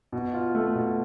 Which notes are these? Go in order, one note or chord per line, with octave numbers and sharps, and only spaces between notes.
B2
F4
A3
B2